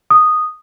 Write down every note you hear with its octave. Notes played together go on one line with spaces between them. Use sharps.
D#6